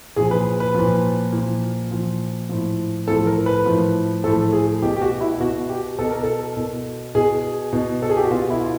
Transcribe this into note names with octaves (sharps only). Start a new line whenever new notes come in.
A#2 F3 G#4
B4
B4
A#2 F3
A#2 F3
A#2 F3
A2 F3
A2 F3 A4
A#4
B4
A2 F3
A2 F3 A4
G#4
B2 G4
G4
F#4
E4
B2 F#4
G4
B2 A4
A#4
A4
B2
B2 G#4
B2
A4
G#4
G4
F#4
B2 F4
E4
F4